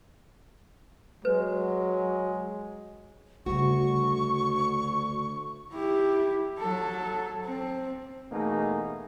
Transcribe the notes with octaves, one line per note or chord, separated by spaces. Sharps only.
F#3 G#3 B4
D2 C#3 G3 F#4 C#6
E4 G4
F#3 A4
C4
B2 E3 A3 A#3 D#4 G#4